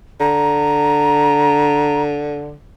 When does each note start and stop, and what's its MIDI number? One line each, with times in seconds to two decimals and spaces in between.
0.20 2.56 50
0.20 2.03 82